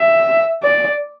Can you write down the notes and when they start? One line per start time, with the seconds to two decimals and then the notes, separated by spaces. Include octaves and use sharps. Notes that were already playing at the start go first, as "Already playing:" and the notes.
Already playing: E5
0.63 D5